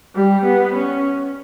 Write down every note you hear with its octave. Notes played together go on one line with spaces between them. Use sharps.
G3
B3
C#4